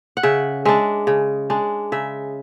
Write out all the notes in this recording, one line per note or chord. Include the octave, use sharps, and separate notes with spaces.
F#5
C#3 E5
G#3 D4 E5
C#3
G#3 D4
C#3 E5